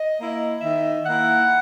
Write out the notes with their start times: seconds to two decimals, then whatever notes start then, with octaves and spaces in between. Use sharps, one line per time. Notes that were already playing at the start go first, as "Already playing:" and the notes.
Already playing: D#5
0.17 A#3 E4
0.61 D#3 E5
1.06 A#3 E4 F#5